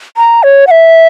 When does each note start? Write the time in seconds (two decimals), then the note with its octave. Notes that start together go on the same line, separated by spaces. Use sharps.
0.17 A#5
0.43 C#5
0.67 F#5
0.71 E5